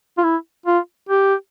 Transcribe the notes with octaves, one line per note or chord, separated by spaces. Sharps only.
F4
E4
F4
G4